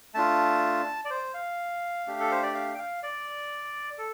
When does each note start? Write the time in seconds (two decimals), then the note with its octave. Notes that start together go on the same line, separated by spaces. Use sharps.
0.14 A3 D4 F4 A5
1.05 D5
1.10 C5
1.34 F5
2.07 A3 D4 G4
2.20 A4
2.31 C5
2.43 D5
2.54 F5
2.74 G5
2.78 F5
3.03 D5
3.98 A4